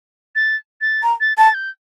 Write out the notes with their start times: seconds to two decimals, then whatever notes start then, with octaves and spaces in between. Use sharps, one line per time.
0.35 A6
0.81 A6
1.03 A#5
1.21 A6
1.37 A5 A6
1.54 G6